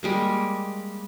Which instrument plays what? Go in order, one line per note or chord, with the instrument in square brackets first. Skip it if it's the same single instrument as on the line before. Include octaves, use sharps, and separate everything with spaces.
[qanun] G3 G#3 A#3